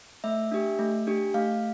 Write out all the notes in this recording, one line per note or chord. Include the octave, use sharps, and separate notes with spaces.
A3 E5
D4 G4
A3
D4 G4
A3 F5